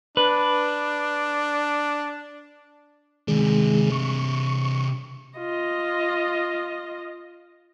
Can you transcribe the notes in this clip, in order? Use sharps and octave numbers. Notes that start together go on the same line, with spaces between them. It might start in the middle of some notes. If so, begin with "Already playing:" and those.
D4 B4
C3 D#3 G#3 D4 G#4
C#6
F4 D#5